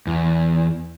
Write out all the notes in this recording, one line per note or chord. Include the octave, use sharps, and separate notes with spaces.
E2